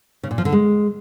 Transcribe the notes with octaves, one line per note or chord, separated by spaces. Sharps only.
C#3
A#2
F3
D3
G#3